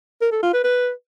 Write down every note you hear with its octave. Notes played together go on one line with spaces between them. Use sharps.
A#4
A4
F4
B4
B4